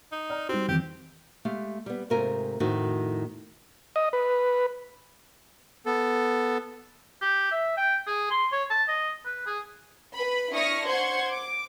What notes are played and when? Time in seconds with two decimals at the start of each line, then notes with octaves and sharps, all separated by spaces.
0.12 D#4
0.30 D5 A#5 F6
0.49 G3 C4 D#4 F#4
0.68 F2 D#3 E3 G4
1.45 G#3 A3 G4 F5
1.86 G3 B3
2.10 G#2 C3 A3 F4 A#4 G#5
2.60 F2 A2 D#3 F#4
3.96 D#5
4.13 B4
5.86 B3 A4
7.21 G4
7.51 E5
7.77 G5
8.07 G#4
8.30 C6
8.52 C#5
8.70 A5
8.88 D#5
9.25 B4
9.46 G#4
10.13 B4 B5
10.52 D4 E4 C#6 D#6 F6 A#6
10.86 C5 F#5 C6 C#6 G#6
11.29 D6